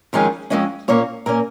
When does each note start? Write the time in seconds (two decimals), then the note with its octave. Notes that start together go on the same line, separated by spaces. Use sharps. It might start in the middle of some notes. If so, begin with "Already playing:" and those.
0.13 F2 D#3 G#3 C#4 F4
0.50 F2 D#3 G#3 C#4 D#5
0.88 A#2 A#3 C#4 C#5
1.26 A#2 A#3 C#4 A#4